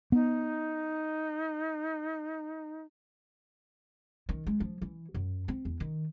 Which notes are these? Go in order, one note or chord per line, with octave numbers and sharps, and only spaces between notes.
B3 D#4
D#3
G#3
F3
E3
F#2
C4
E2
D#3